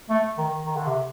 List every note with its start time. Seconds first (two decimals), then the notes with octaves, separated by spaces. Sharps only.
0.09 A3
0.38 D#3
0.66 D#3
0.76 D3
0.86 C3